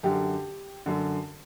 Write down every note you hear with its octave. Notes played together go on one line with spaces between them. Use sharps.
F#2 D3 G4
F#2 D3